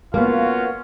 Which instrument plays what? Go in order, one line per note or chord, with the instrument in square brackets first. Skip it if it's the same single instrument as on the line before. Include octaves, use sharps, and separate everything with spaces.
[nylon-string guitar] A#3 B3 [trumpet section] C#4 F4 F#4